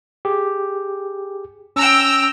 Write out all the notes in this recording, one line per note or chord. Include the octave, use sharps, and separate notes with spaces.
G4 G#4
C#4 G5 A#5 E6